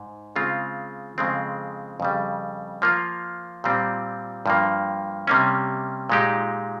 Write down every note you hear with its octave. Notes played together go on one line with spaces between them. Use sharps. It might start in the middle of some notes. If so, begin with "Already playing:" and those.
Already playing: G#2
C#3 G#3 C4 F4
F2 C#3 F3 G#3 C4
F2 C#3 G3
F3 A#3 F4
A#2 G3 C4
G2 F3 A#3
C3 G3 A#3 C#4
A#2 G#3 D#4 G4